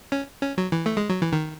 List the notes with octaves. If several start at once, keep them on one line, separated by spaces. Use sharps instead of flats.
C#4
C#4
F#3
E3
A3
G#3
F#3
E3
D#3